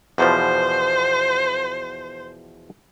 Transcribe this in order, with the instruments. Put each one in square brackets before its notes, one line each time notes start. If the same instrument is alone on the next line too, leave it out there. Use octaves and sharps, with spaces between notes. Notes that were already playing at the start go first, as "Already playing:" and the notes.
[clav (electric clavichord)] E2 B2 F3 [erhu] C5